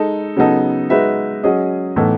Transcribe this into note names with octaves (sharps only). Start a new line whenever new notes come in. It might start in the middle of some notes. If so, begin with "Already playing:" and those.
Already playing: G#3 D#4 A4
C#3 F#3 B3 D#4 A4
G#3 D#4 F#4 B4 E5
F#3 C#4 G#4 D#5
A2 E3 B3 D#4 A4